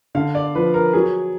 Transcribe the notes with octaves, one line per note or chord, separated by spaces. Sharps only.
D3 F5
D5
F3 B4
A#4
F#3 G#4